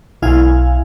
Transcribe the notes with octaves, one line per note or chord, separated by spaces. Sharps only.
B1 E4 F5 G#5